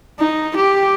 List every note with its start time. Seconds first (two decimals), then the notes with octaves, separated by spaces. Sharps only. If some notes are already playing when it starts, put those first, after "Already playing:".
0.19 D#4
0.56 G4